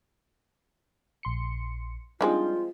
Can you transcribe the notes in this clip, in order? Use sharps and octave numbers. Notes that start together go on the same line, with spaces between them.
A#1 C6 C#7
F3 G3 G#3 C4 D4 D#4 F4